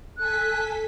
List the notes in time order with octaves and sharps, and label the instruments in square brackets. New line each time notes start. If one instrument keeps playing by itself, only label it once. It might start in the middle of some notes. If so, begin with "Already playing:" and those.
[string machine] A4 G#5 B6 [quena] F#6